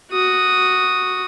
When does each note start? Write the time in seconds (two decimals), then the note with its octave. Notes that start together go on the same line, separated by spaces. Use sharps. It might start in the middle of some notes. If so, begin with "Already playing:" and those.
0.11 F#4 D#6